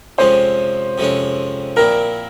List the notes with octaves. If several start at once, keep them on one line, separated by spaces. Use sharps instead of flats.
F2 C3 F3 G#3 C#4 C5
F2 C3 F3 G#3 C#4
A#2 F3 C4 E4 A#4